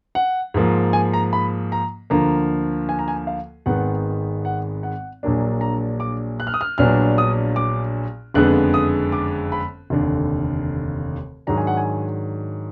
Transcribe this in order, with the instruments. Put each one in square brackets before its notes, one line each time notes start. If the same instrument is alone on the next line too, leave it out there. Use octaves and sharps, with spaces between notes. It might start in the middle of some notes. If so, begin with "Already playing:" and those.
[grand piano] F#5
G#2 F3 A#3
G#5
A#5
B5
A#5
D2 D3 F3 A#3 A#5
G#5
A#5
G#5
F5
G#1 G#2 D#3 G#3 B3 F#5
F#5
F#5
A#1 A#2 F#3 A#3 D4
A#5
D6
F#6
F6
D#6
F6
A#1 A#2 F#3 B3 D4 F6
D#6
D6
F#1 F2 D3 G#3 B3 F#6
D#6
D6
B5
F1 D#2 D3
G#2 D#3 F#3 D4 A#5
G#5
F#5
G#5